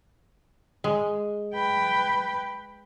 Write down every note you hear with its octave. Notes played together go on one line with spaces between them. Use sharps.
G#3
B4 G5